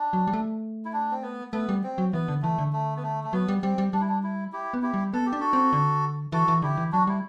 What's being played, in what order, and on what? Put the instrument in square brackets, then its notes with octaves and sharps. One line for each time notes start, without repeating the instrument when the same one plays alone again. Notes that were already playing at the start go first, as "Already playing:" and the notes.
Already playing: [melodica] D4
[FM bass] F#3
G3
A3
[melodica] E4
D4
C4
B3
[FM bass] A3 [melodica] B3
[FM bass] G3
[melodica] C4
[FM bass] F#3
[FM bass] E3 [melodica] B3
[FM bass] D3
[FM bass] E3 [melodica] A3
[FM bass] D3
[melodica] A3
B3
A3
A3
[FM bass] F#3 [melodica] B3
[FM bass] G3
[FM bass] G3 [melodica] C4
[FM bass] G3
[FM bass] G3 [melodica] D4
[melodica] E4
D4
E4
E4 G4
[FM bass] B3
[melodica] E4 G4
[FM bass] G3
[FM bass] B3 [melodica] A4
[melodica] G4
[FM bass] D4
[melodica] F#4 A4
[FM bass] C4
D3
[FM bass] E3 [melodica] F#4 A4
[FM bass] E3
[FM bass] D3 [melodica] E4 G4
[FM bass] E3
[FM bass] F#3 [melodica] D4 F#4
[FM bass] G3 [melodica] E4